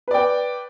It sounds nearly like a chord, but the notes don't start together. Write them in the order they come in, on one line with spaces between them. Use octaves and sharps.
B4 D5 G5